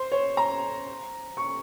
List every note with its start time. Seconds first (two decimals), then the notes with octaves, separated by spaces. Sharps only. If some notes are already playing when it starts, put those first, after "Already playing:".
Already playing: C5
0.12 C#5
0.37 A#5
1.37 C#6